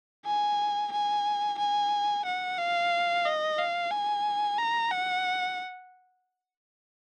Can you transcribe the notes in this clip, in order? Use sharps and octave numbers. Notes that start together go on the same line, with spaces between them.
G#5
G#5
G#5
F#5
F5
D#5
F5
G#5
A#5
F#5